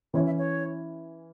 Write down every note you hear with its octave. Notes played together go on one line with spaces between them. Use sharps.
E3 C#4 E4 C#5
E5
C#5